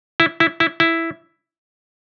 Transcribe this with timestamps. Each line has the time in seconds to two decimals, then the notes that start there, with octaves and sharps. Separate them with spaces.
0.20 E4
0.40 E4
0.60 E4
0.80 E4